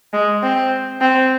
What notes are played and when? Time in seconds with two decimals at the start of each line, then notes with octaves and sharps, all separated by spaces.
0.13 G#3
0.43 C4
1.01 C4